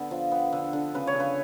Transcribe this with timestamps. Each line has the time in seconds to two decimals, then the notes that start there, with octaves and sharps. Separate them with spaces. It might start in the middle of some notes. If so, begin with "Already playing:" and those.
Already playing: D3 B3
0.11 F3
0.32 B3
0.52 D3
0.73 D3
0.94 C#3 B4
1.07 C#5
1.14 C#3
1.20 B4